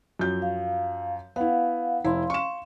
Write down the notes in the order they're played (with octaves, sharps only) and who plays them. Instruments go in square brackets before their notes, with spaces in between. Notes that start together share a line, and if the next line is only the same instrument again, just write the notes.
[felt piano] F#2 F3 G6
[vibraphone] F5
[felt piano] B3 E4 [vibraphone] F5 F#5
[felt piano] F1 E4 [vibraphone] F5 C6
[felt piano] C#6 E7